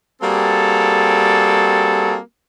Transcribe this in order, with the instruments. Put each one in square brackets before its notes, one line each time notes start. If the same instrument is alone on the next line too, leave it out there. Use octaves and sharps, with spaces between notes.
[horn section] G3 A#3 C4 F#4 G#4 A4